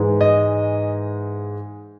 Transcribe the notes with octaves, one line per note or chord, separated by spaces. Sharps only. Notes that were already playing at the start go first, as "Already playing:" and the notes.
Already playing: G#2 E3 G#3
D#5